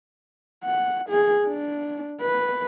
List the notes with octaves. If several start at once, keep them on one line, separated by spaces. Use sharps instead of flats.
F#5
G#4
D4
B4